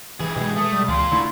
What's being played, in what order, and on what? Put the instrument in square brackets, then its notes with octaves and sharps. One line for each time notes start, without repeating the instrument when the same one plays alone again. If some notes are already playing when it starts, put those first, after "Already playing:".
[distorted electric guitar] G2 G#4 [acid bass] E3
[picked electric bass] B2 G#3
[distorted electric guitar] A3 [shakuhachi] D#6
[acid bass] G3
[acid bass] C#2 [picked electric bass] E3 [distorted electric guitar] F4 D5 [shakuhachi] C6
[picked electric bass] D3 A3 [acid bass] E4